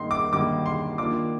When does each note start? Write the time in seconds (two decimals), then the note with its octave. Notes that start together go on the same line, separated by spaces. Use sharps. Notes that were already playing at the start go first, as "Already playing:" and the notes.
Already playing: G2 D#3 G3 A#3 D#4 C6
0.11 D6
0.33 G2 D#3 G3 A#3 D#4 D6
0.66 C6
0.98 D#3 A#3 D4 F4 D6